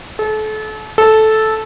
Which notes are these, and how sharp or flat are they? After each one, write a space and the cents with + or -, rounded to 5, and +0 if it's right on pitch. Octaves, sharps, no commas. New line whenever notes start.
A4 -35
A4 -10